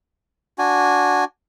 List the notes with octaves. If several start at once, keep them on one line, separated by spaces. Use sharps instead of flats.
D4 F#4 G#5